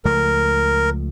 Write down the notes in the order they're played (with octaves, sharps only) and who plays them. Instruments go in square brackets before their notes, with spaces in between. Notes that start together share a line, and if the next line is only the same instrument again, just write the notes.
[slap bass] C#2 F3 A3 [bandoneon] A#4